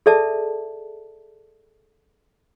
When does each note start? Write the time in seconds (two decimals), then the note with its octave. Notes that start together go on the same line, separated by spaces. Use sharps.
0.06 G#4 A4 D5 E5 A5